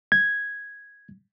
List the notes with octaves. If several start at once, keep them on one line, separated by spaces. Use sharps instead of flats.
G#6